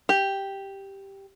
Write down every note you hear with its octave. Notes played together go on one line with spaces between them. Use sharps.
G4